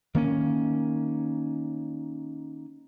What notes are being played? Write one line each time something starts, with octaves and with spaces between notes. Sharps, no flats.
D#3 A#3 C#4